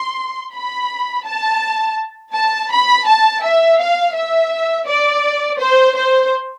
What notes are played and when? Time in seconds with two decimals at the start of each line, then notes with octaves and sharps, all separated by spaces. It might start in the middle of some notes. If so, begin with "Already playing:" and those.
Already playing: C6
0.54 B5
1.26 A5
2.35 A5
2.71 B5
3.06 A5
3.43 E5
3.80 F5
4.15 E5
4.87 D5
5.60 C5
5.97 C5